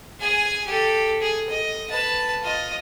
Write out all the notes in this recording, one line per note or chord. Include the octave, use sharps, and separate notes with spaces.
G#4 G#5
G4 A4
G#4
D#5
B4 A5
F4 D#5